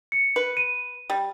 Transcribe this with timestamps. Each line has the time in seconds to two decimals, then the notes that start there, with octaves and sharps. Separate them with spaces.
0.12 C#7
0.36 B4
0.57 D#7
1.10 G3